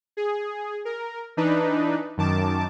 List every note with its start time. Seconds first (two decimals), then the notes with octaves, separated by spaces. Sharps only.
0.17 G#4
0.85 A#4
1.37 E3 D4 D#4 B4
2.17 F#2 D#3 A5 D6